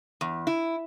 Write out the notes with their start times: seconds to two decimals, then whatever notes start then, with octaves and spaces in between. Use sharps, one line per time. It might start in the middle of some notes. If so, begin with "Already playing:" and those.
0.21 E2
0.47 E4